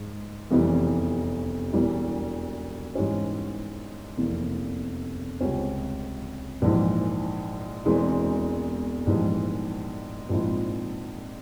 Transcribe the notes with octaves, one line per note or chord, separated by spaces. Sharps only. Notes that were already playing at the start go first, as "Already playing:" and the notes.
Already playing: G#2
F1 E2 C3 E3 G3
E1 E2 E3 G3
G#2 E3 G3 C#4
F1 E2 C3 E3 A#3
C#2 C3 G3 C#4
A#1 G#2 E3
E1 E2 E3 G#3 C4
A#1 G#2 E3 G3
A#1 G#2 F3 C4 E4